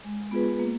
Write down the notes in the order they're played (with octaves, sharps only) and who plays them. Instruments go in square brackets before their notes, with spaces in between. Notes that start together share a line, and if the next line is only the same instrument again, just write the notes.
[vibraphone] G#3
B3 F4 G#4 B4
A#3